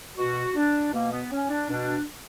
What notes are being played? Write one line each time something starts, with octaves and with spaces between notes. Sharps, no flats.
B2 F#4
D4
B2 A#3
B3
C#4
D4
B2 D4